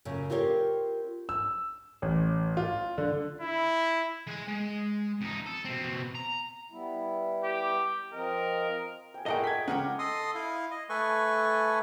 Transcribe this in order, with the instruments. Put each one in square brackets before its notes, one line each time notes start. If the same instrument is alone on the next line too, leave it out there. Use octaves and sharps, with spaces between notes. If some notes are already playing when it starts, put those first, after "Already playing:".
[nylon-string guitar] F#2 C#3
C4 F4 G4 A#4 C#5
[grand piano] E6
A1
F4
D3
[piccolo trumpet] E4
[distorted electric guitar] G#3 G#5
G#3
F2 D#4
A4
B2 C4
A#5
[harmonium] G3 B3 E4
[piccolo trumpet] G4
[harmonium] F3 C4 D#5 [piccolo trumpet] A#4
[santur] G5 G#5
[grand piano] A#2 A#3 [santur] A3 D#4 G#4 [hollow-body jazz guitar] D#5 F#5 G5
[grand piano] G#6 B6
[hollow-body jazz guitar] C#2 A#2 C#4 [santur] A#4 A#5 D6 [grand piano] F#5 G5
[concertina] A4 D#5 C6 D#6
E4 F5
D#5
A3 A4 B4 G#5 C#6